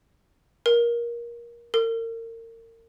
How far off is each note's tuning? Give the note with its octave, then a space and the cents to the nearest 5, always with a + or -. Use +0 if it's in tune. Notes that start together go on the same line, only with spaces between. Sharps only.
A#4 +20
A#4 -35